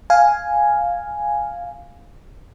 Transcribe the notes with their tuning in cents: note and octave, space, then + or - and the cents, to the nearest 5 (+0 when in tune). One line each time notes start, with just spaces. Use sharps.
F5 +0 G#5 +0